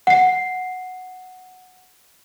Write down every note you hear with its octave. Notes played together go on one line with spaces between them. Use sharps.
F#5 C7